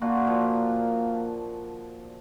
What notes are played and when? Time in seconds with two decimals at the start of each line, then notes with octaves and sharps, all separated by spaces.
0.02 A#3 D4 F4 F#4
0.27 A#2 F3